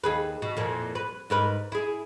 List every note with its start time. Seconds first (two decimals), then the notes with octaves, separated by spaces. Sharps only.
0.04 D#2 G#4 B4
0.42 B2
0.57 F2 A#2 E3
0.95 B4
1.30 G#2 A#4 B4
1.72 E4 G#4